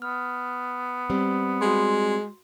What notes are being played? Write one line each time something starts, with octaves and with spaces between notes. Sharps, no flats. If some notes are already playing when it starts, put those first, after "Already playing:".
B3 F6
G3 C4
G#3 F#4 C6